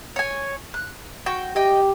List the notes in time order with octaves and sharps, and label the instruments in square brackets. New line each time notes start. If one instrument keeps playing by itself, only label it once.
[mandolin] C#5 G#5
F#6
F#4 G5
[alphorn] G4 [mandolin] D#5 G5